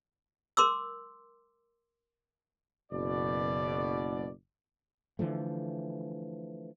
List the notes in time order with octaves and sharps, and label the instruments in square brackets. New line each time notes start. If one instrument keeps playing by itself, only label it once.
[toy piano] A#4 C6 D6 E6
[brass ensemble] F#1 B2 D5
[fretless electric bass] D3 E3 F3 A3